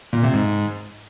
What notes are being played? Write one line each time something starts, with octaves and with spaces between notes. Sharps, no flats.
A#2
C3
G#2